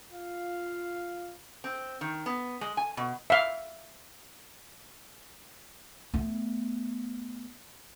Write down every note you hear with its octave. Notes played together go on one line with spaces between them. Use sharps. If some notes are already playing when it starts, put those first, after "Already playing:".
F4 F5
C4
D#3
B3
G#3
G#5
B2
E5 F5
A3 B3